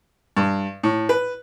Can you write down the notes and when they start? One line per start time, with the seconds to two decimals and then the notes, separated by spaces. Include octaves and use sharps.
0.37 G2
0.83 A2
1.09 B4